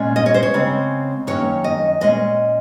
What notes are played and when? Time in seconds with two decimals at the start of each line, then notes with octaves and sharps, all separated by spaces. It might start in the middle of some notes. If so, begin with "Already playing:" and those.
Already playing: A#2 G#3 C#4
0.16 D#5
0.26 C#5
0.34 C5
0.43 C#5
0.54 C#3 G#3 C4
1.27 F#2 D#3 A#3 C#4 C#5
1.64 D#5
2.01 A#2 G#3 C#4 D#5